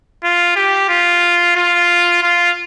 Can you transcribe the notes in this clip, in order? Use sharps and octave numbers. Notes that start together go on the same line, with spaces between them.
F4
G4
F4
F4
F4